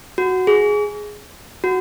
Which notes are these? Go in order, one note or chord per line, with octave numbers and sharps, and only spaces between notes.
F#4
G#4
F#4